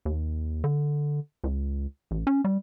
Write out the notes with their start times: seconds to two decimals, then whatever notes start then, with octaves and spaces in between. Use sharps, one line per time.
0.05 D#2
0.64 D3
1.44 C#2
2.11 A1
2.27 C#4
2.44 G3